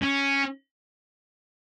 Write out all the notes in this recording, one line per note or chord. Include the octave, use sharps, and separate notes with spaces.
C#4